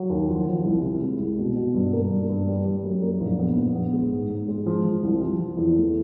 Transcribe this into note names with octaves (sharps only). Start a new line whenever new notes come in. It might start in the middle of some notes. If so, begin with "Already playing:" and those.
Already playing: F#3
D#2
F3
F3
C2
C3
G#3
C2
B2
B2
G2
A#3
G2
G2
G3
G3
F#2
A#3
A#1
B3
A#1
B3
G#3
G#2
G#2
G#3
F3
F3
C2
F3
F3
E2
A3